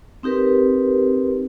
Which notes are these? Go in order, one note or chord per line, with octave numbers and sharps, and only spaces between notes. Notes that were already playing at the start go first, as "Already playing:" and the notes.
C4 D#4 G4 A#4 B4